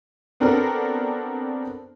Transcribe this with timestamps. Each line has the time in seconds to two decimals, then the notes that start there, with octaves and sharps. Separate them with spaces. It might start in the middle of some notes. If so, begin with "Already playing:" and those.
0.40 B3 C4 D4 F#4 A4 A#4